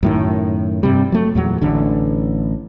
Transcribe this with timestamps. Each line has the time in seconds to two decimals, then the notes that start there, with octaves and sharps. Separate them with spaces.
0.03 F#2 A2 D#3
0.83 G2 C3 G3
1.12 F#3 A3
1.35 E2 A#2 F#3
1.61 A1 D3